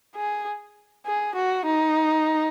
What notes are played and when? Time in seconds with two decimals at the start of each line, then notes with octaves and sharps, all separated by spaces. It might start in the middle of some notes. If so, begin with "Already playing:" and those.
0.16 G#4
1.06 G#4
1.35 F#4
1.65 D#4